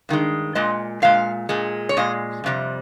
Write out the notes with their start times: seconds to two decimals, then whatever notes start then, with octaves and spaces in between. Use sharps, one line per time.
0.09 G2 D#3 G#3
0.55 A#2 G#3 D#5
1.02 A#2 G#3 F5
1.49 A#2 G#3
1.89 C#5
1.97 A#2 G#3 D#5
2.44 F2 C3 G3